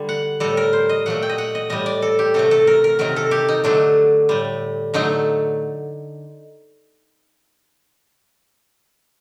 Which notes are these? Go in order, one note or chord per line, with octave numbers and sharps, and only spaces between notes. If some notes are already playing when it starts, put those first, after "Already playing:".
Already playing: D3 G3
F#5
A2 G3 A4
A#4
C5
D#5
A#2 F#3 A3 F#5
G5
D#5
F#5
D#5
A2 G3 D#5
D5
A4
G4
C3 F#3 A3 A4
A4
A#4
A#4
C3 D#3 F#3 A#4
A4
G4
D#4
D3 F#3 A3 D4
A2 G3
D3 F#3 A3 D#4